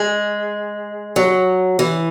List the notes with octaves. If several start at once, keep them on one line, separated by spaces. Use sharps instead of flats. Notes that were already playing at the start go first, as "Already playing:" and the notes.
Already playing: G#3
F#3
E3